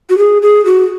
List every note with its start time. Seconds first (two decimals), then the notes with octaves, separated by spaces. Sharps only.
0.10 F#4
0.18 G#4
0.42 G#4
0.65 F#4